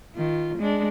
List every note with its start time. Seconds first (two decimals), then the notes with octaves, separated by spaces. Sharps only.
0.15 D#3 F4
0.58 G#3 D4